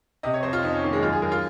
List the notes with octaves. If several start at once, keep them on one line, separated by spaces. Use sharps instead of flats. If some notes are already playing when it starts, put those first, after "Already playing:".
C3 D#5
C#5
F2 C5
F4
F2 D#4
C#4
D#3 A#3
G#3
F#2 F4
G#4
F#2 A#4
F4